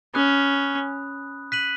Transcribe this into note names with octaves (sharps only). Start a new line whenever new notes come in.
C#4 B5 D#6 F#6
F#6 B6 D#7 F#7